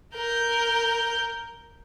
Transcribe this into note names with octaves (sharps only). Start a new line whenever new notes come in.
A#4 G6